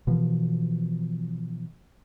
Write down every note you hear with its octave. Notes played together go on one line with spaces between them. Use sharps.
B2 E3 F3